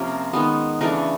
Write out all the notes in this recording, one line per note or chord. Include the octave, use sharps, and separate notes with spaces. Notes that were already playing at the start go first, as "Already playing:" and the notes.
Already playing: C3 F3 A#3 C#4 A#4
D#3 G#3 B3
C#3 E3 A3 D4 A#4